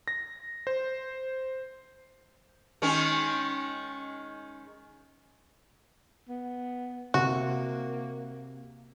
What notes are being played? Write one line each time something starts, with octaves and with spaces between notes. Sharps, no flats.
A#6
C5
D#3 G#3 C#4
B3
C3 A#3 F#4